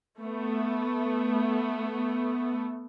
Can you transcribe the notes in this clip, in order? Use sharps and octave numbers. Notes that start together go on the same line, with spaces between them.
A3 B3